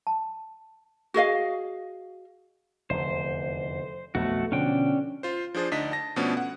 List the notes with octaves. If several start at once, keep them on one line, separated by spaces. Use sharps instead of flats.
A5
F#4 G#4 D#5 F5
F1 E2 D3 C5
B1 F2 A3 B3 F#4
B2 D3 F3 C#4 D4 G5
F4 C5
F3 D4 G#4 C5 A6
D2 D4 D#4 D#5 B6
A5 A#6
B2 F3 A3 B3 C#4 D4
F#5